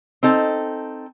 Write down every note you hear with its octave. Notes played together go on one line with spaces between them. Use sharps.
C4 D#4 A4